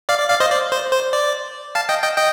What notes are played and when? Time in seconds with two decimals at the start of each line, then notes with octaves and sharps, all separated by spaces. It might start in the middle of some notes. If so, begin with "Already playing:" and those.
0.09 D5 F5
0.20 D5
0.30 D5 F5
0.40 C5 D#5
0.51 D5
0.72 C5
0.92 C5
1.13 D5
1.75 F5 A5
1.89 D#5 G5
2.02 D#5 G5
2.17 D#5 G5